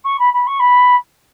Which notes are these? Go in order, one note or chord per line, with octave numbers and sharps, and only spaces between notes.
C#6
B5
B5
C#6
B5